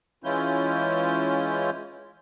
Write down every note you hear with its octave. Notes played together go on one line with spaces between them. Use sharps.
E3 G#3 C#4 E4 F4 G6